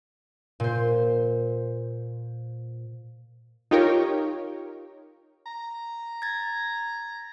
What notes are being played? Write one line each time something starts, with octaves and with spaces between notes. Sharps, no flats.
A#2 C5
D#4 F4 G4 A#4 C#5
A#5
G#6 A6